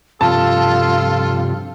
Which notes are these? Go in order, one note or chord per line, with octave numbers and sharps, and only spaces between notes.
G2 C3 F3 F4 A4 A5